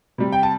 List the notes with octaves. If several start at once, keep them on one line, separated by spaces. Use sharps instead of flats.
C3 G3
G5
A5